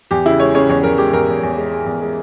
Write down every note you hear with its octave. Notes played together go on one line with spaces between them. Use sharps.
E2 G4
C#3 E4
G#3 C#5
C#3 C#5
E2 C#5
E2 A#4
G#3 G4
E2 A#4
E2
E2
G#3
G#3
E2
G#3